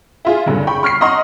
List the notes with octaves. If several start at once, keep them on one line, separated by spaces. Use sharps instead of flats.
E4 F4 G#4
F#1 G2 D3
G5 B5 C#6
C#6 F6 B6 C7
D#5 F#5 A#5 C6 C#6 D#6